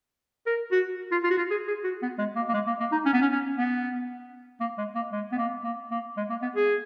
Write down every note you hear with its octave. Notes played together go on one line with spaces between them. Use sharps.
A#4
F#4
F4
F4
F#4
F4
G#4
G#4
F#4
B3
G#3
A#3
A#3
G#3
A#3
A#3
D#4
C#4
B3
C#4
C#4
B3
A#3
G#3
A#3
G#3
B3
A#3
A#3
A#3
G#3
A#3
B3
G#4